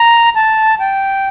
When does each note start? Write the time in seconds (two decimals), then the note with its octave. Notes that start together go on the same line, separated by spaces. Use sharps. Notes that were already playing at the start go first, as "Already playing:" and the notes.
Already playing: A#5
0.35 A5
0.79 G5